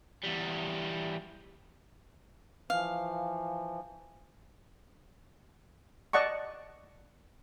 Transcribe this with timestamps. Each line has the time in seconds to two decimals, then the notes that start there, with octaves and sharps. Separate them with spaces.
0.24 E2 G3
2.70 E3 F3 F5
6.13 D5 D#5 F#5 A5 C#6